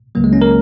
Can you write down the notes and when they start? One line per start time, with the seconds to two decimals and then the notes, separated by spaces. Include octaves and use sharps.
0.15 C#2 C#3 F#3 A#3
0.24 G#3
0.33 C#4
0.42 A#4